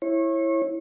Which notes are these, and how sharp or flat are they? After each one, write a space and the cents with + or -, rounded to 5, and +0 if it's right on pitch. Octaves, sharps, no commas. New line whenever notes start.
E4 +0 C#5 -30